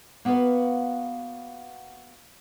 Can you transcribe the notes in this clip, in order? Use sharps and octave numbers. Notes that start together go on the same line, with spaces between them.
A#3 B3 F#4 A#4 B4 F5